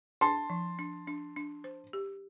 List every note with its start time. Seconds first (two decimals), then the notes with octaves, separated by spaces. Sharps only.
0.21 D4 A5 C6
0.50 F3
0.79 D4
1.07 D4
1.36 D4
1.64 C5
1.93 G4